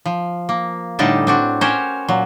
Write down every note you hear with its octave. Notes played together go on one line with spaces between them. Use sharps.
F3
A#3
A2 D3 G3 D4 D#4 A5
C4 D4 F#4
C#4 F#4 G4 A#4 C5 C#5
A#2 F#3